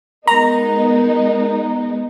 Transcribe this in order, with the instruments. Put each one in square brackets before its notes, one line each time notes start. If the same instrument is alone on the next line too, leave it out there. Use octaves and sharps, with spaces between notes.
[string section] G#3 B3 D#4 [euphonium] A#4 [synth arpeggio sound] A#5